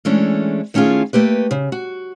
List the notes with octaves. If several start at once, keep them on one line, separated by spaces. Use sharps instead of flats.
E3 G#3 A3 C#4 D4
D#3 A3 C#4 E4 F4 G#4
A3 A#3 G4 B4
C#3
F#4